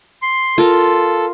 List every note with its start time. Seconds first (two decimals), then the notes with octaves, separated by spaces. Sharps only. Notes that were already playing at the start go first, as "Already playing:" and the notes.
0.22 C6
0.58 F4 A4 A#4